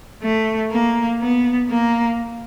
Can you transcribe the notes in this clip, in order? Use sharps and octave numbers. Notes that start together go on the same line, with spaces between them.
A3
A#3
B3
A#3